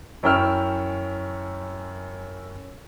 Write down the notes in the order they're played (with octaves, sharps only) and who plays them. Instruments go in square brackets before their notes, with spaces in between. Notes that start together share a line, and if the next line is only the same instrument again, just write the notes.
[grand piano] F#2 C#4 E4 G5 E6 F6